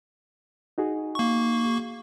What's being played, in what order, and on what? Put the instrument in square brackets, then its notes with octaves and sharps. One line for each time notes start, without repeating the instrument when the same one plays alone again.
[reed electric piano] D#4 F#4 G#4
[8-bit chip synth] A#3 C#6